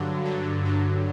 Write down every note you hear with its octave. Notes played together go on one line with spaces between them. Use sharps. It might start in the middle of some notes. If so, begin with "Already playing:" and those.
Already playing: G2 D3 F#3
G2 D3 F#3
G2 D3 F#3